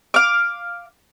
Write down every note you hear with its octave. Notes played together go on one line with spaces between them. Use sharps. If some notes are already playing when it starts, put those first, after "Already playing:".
F5 D6